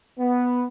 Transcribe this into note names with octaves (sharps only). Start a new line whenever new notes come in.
B3